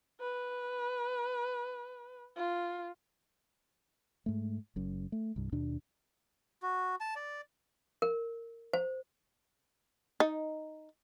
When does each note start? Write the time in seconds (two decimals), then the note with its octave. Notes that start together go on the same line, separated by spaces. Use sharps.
0.21 B4
2.37 F4
4.26 G#2 A3
4.76 F#1 F#2
5.12 A3
5.36 C2 G2
5.52 D#2 B2 D4
6.63 F#4
7.00 A5
7.16 D5
8.02 A#4
8.73 C5
10.20 D#4